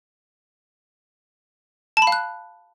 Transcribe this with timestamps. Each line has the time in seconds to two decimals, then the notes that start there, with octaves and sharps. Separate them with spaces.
1.97 A5
2.02 B5
2.07 F5
2.12 F#6